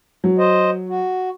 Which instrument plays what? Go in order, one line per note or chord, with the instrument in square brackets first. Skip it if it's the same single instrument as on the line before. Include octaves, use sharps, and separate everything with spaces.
[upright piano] F#3
[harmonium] C5 D#5
F#4